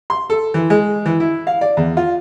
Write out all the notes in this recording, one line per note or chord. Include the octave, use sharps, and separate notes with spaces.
C6
A4
E3
G#3
E3
E4
F5
D5
E2
F4